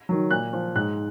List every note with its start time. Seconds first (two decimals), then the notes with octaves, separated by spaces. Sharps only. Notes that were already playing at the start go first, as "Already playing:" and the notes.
0.09 D#3 F#3
0.31 A#2 F#6
0.53 F3
0.75 G#2 F#6